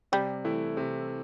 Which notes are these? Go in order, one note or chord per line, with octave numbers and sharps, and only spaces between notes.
C3 G3
E3 A3 E4
C3